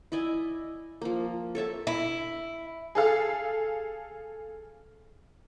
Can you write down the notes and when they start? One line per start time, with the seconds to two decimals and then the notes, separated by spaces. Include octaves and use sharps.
0.12 E4 D5 D#5 G#5
1.02 F3 A#3
1.55 A4 C#5 E5 A5
1.87 E4
2.95 G#4 A4 F5